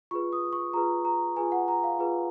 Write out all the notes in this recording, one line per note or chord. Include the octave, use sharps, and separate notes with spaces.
F4 G#4 B4 C#6
D#6
C#6
F4 G#4 B4 A#5
A#5
F4 G#4 B4 G#5
F#5
A#5
F5
F4 G#4 B4